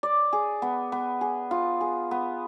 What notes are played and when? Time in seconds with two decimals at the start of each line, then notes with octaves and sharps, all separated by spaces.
0.03 D5
0.33 G#4
0.62 B3
0.92 B3
1.21 G#4
1.51 F4
1.81 G#4
2.11 B3